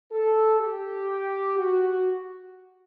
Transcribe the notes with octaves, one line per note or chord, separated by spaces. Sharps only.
A4
G4
F#4